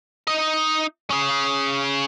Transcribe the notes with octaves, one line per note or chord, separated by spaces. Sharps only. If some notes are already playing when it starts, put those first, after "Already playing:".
D#4 D#5
C#4 G#4